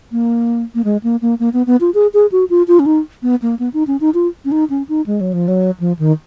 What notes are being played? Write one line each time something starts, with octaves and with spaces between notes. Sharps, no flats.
A#3
A#3
G#3
A#3
A#3
A#3
B3
B3
F4
G#4
G#4
F#4
F4
F4
C#4
D#4
B3
A#3
B3
D#4
C#4
D#4
F4
C#4
D#4
C#4
D#4
G#3
F#3
F3
F#3
F3
D#3